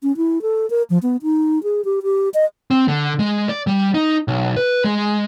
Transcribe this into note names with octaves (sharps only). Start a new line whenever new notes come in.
C#4
E4
A4
A#4
F3
B3
D#4
G#4
G4
G4
D#5
C4
D3
G#3
D5
G3
D#4
B1
B4
G#3